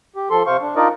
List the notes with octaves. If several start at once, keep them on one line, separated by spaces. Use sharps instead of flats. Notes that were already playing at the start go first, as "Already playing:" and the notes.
G4
F3 A4 C6
C3 C5 F5 C#6
D4
D4 D#4 F4 A#4 D5 D#5